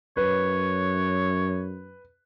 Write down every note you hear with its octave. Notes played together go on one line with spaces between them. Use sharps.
F#2 B4 C#5